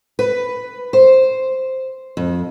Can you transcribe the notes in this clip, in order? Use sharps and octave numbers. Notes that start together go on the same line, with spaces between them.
B4
C5
F2